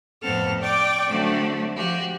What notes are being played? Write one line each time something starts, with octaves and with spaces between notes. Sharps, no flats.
F2 A2 B3 C4 A4 F6
D5 G5 C#6 D6
D3 F#3 A3 C4 F#4
F3 F#4 G4